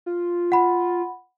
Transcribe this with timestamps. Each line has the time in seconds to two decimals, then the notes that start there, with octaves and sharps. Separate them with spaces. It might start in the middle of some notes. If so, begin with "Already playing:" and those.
0.06 F4
0.52 F#5 B5